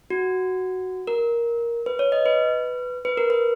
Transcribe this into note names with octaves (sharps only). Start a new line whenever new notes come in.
F#4
A#4
B4
C#5
D#5
B4
B4
A#4
B4